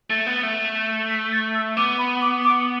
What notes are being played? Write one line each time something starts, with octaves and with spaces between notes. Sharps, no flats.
A3 A6
B3
A3
B6
A6
E6
B3 D6
B5
D6
D6